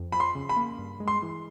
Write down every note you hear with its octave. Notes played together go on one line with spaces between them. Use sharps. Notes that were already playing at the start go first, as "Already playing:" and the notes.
Already playing: F2
F3 B5
C6
C#3
B5
A#3
G2
G#3
C6
E3